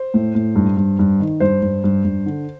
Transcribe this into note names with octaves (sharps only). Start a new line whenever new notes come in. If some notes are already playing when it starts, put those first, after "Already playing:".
Already playing: C5
A2
A2
G2
G2
G2
D#3
G2 C5
G2
G2
G2
D3